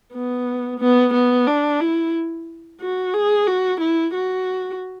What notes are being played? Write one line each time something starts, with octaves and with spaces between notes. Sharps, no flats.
B3
B3
B3
D4
E4
F#4
G#4
F#4
E4
F#4